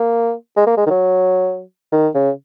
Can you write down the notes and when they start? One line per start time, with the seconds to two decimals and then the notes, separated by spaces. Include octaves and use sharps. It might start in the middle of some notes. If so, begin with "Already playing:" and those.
Already playing: A#3
0.57 G#3
0.67 A#3
0.77 G#3
0.86 D#3
0.90 F#3
1.92 D#3
2.15 C#3